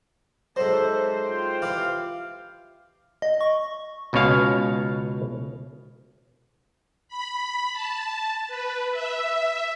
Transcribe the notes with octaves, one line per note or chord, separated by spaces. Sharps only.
G#2 F#3 A4 C5 E5
F4 G5
E3 G4 F5
D#5
C#6
C#2 B2 C#4 C#5 F5
B5
A5
B4
E5